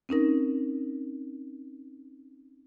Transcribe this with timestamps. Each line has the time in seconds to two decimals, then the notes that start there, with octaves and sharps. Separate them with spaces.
0.09 C4 C#4 D#4 A#4